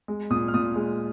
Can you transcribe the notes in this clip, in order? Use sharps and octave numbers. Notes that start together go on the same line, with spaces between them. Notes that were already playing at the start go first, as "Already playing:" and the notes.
G#3
A#2 D#6
F6
A#2 D#6
G#3